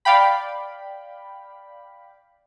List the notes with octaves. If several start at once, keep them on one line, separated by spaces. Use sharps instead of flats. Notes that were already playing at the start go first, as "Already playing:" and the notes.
D5 F5 G5 B5